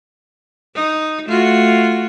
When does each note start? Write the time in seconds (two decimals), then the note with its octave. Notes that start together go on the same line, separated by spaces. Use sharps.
0.75 D#4
1.26 A3 F4 F#4